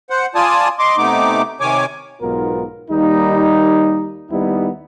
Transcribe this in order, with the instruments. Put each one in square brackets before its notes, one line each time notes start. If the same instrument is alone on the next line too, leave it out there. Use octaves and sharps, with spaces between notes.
[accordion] C5 F#5
F4 D5 G#5 A5 D#6
D#5 C6 D6
C3 A3 B3 D#4 D6
C3 D#3 C#5 G#5 D6
[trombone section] B1 G#2 B3 F4 A#4
D#2 G3 A#3 D#4
D#2 G3 B3 D#4 E4